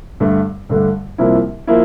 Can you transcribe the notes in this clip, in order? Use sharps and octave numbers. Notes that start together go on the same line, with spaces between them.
G2 D3 A3
G2 D3 A3
C2 C3 F3 A#3 E4
F3 A#3 E4